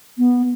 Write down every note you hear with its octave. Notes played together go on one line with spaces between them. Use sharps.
B3